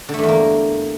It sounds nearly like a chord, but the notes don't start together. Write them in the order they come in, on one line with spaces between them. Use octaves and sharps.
D3 A3 G2 E2 A#3